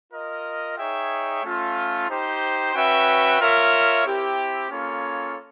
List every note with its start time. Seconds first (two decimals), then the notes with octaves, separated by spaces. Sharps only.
0.11 F4 A#4 D#5
0.77 D#4 G#4 C#5 E5 G5
1.42 A3 C#4 F4
2.08 D#4 G4 C5
2.74 C#4 F#4 B4 E5 G5
3.39 F4 A#4 C#5 E5
4.05 C4 E4 G4
4.70 A#3 C#4 F4 A4 C#5